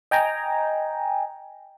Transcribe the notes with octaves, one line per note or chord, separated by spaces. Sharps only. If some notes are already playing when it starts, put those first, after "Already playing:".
D#5 G5 G#5 A#5